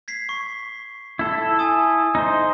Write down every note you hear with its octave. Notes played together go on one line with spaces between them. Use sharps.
G#6 B6 C7
C#6
E4 A4
G#5 D#6
D#4 C5